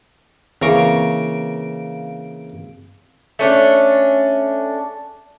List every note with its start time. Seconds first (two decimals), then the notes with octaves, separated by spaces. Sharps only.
0.62 C#3 E3 A#3 C4 F5 A#5 C#6 D7
3.39 A3 C#4 D4